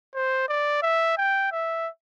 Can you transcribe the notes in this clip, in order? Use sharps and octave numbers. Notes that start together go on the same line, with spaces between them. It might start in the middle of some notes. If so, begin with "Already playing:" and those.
C5
D5
E5
G5
E5